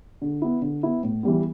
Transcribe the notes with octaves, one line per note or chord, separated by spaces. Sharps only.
D3
B3 E4
D3
B3 E4
A2
E3 G3 B3